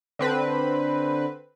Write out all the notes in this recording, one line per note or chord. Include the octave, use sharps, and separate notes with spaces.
D3 C4 B4